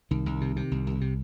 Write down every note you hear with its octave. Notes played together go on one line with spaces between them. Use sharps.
C2 D#3
C2
C3
C3
C2
C2
C3